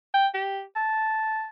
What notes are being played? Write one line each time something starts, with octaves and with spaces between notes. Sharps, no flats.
G5
G4
A5